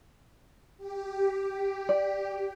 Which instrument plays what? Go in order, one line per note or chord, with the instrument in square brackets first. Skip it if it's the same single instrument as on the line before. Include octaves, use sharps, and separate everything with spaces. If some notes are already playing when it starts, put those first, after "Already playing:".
[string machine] G4
[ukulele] D5